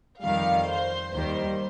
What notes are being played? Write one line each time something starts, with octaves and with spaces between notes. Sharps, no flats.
F2 D#3 G3 F5
C5
D#2 D#3 G3 C5